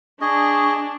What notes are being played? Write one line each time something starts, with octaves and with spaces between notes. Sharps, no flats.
D4 G#4 D#5 C#6